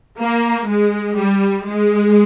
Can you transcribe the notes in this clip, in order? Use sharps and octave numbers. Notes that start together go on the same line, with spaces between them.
A#3
G#3
G3
G#3